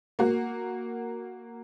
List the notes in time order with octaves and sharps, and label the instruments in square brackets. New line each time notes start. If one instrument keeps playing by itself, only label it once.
[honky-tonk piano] A#3 F#4